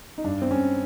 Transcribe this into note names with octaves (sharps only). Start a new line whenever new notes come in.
D#4
G2 D4
C4
G2 C#4